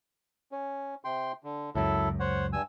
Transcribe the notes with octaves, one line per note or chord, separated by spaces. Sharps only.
C#4
C3 G5 C6
D3
C#2 F#2 F#3 E4 A4
C5 C#5 F#5
G2 G#5 E6